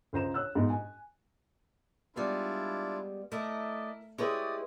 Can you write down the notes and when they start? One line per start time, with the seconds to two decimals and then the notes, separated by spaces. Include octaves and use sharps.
0.13 C#2 C5 A#5 E7
0.34 C#5 E6 F#6
0.55 G#2 B2
0.70 G#5
2.16 G3 G#3 B3 D4 E4 F4
3.32 A3 E4 A#4 D5 D#5
4.18 G#3 E4 G4 B4 C#5 D5 G#5 D#6